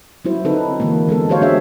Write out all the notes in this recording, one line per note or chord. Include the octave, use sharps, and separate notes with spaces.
F#3 G3 E4 F#4 C5
D3 C4 D#4 A4 B4
D3 E3 G#3 A#3
E3 G#3 B3 A4
G#3 F#4 G4 C5 C#5 F5
B3 D4 F#4 G#4 C#5 E5